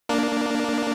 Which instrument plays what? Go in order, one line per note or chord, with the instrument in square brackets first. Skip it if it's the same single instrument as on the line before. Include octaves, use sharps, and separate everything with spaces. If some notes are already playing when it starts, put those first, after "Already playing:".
[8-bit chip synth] A#3 D4